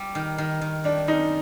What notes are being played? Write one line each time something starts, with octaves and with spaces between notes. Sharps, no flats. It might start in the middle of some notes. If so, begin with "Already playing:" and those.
Already playing: G3
D#3
D#3
D#3
G3 D4
F#2 D#4